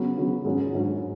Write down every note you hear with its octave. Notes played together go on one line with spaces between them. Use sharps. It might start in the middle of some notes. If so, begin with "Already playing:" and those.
Already playing: C#3 F#3 B3
C#3 F#3 B3
G#2 F#3 C#4 F#4
G#2 F#3 C#4 F#4